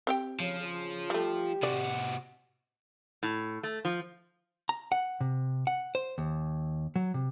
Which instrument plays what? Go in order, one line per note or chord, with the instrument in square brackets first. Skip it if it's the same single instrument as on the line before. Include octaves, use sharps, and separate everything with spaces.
[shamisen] C4 G4 G5
[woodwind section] C#3 [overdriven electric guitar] F3
[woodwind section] C#3
[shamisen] G3 A3 [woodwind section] G4
[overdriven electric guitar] C3 F#4 [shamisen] D5
[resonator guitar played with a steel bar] A2
A3
F3
[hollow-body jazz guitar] A#5
F#5
C3
F#5
C5
D#2
F#3
C3